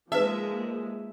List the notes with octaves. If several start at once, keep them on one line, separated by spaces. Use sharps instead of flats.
F3 G#3 A#3 D#4 B4 E5